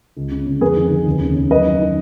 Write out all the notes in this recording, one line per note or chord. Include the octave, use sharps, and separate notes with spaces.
C#2
C#3
C#3
F2 G#4 B4
D#3
D#3
D#2
C#3
C#3
F#2 B4 D#5
D#3
D#3